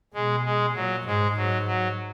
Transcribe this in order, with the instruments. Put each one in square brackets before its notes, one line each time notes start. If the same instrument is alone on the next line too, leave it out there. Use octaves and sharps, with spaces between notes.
[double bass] B2 [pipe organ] G#3
[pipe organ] G#3
[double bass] A#2 [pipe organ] F#3
[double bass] G#2 [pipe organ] G#3
[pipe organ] F#3
F#3